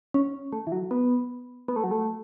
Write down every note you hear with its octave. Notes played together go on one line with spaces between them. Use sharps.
C#4
A3
E3
F#3
B3
B3
A3
F#3
A3